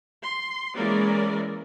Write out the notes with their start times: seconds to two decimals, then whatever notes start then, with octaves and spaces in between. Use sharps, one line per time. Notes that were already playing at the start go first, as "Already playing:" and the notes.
0.24 C6
0.75 E3 G#3 A#3 C#4 A#4 D5